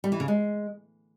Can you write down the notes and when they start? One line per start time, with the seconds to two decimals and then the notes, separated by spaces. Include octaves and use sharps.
0.04 G3
0.12 E3
0.20 C#3
0.28 G#3